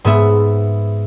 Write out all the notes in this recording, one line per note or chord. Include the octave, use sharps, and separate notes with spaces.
G#2 B3 E5